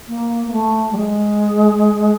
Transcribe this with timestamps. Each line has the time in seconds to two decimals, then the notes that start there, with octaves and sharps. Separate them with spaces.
0.08 A#3
0.47 A#3
0.53 A3
0.92 G3
0.97 G#3